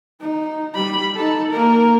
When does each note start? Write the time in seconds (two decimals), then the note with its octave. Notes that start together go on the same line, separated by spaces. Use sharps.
0.21 D#4
0.75 G3 B5
1.16 D#4 A4
1.50 A#3 A#4